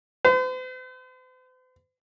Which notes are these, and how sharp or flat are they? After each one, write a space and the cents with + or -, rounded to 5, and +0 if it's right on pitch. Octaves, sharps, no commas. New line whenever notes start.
C5 -45